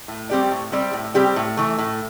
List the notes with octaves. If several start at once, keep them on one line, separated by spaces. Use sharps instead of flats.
A2
G3 C4 G4 D5
A2
G3 C4 G4 D5
A2
G3 C4 G4 D5
A2
E3 A3
A2